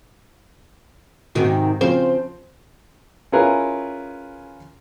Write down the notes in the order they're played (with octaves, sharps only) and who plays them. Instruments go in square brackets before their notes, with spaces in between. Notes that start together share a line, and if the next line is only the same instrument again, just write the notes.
[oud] G#2 C3 D#3 [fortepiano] C4 F#4
[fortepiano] C#3 F3 C4 [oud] C5
[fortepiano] C#4 E4 F4 G#4 A#4 B4